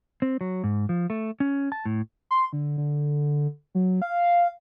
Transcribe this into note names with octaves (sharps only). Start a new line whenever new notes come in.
C4
F#3
G#2
F3
A3
C#4
A5
A2
C6
D3
D3
F#3
F5